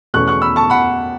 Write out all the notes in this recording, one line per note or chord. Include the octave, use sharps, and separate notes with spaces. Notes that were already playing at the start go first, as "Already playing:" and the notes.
E2 B2 A3 C#4 C#6 F#6
C#6 F#6
B5 E6
A5 C#6
F#5 B5